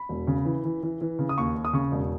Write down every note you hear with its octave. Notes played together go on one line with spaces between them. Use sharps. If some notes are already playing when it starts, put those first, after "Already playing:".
Already playing: B5
E1
C#3
E3
E3
E3
E3
C#3
D#6
D#2 C#6
D#2
D#6
C#3 C#6
E1